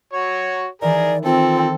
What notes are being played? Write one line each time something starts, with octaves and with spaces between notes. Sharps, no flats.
F#4 C#5
D#3 E3 G3 G#4 A#4 D5
C4 F4 A4